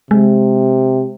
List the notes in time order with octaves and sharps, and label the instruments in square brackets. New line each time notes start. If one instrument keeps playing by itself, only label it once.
[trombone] C3 [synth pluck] G#3